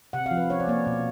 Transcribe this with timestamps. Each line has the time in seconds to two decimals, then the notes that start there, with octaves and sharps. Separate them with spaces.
0.13 C3 F#5
0.26 F5
0.31 F3
0.37 B4
0.50 C#4 C#5
0.60 D5
0.67 A#3 C#5
0.87 B2